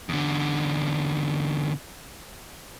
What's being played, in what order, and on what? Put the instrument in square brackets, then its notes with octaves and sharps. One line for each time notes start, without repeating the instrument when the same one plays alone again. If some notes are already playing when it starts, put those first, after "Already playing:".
[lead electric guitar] E2 D3